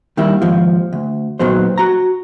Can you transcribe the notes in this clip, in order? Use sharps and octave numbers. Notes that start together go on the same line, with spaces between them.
D#3 G3 A#3 E4
D#2 G#2 F3
D2
D#2 A#2 D#3 F#3 B3 C5
F#4 A#5